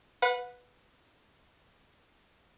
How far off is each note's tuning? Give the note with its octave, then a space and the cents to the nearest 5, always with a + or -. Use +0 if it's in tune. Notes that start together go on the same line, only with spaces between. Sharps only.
B4 +0 F#5 -30